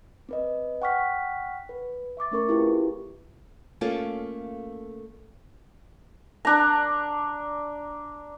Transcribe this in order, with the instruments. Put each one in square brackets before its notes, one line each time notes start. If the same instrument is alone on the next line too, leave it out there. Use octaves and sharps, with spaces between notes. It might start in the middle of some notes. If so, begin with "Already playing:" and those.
[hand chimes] C4 B4 D#5
F#5 G5 C#6 F6 B6
B4
E5 C#6 D6 A6
A3 C#4 A#4 C#6
C4 E4 F4 G4 G#4 B4
[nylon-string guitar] A3 A#3 C#4 F4 A4
[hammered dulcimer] D4 A#5